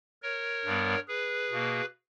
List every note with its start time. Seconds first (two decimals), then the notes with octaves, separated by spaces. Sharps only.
0.22 A#4 C#5
0.65 G2 G3 B3
1.08 G#4 B4
1.51 B2 A#3